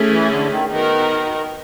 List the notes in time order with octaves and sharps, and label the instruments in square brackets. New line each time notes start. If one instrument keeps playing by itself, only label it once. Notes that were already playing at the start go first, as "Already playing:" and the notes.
Already playing: [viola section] A3 C#4 E4 G#4
[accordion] E3
D3
D#3
[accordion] D#3 [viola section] B3 D#4 F#4 A#4